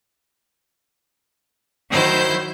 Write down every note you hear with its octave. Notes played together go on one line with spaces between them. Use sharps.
D#3 F#3 E4 C5 G6